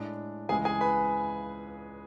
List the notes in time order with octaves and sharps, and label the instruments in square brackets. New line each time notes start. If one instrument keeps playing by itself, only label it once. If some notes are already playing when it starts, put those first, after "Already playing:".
Already playing: [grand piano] A2 G#3 D4
C#2 C#3 E3 G#3 G#4 G#5
G#4 G#5
B4 B5